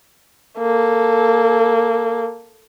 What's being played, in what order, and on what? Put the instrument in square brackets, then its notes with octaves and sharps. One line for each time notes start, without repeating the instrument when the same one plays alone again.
[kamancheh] A#3 A4